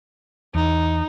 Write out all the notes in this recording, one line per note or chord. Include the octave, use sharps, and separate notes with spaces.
E2 D#4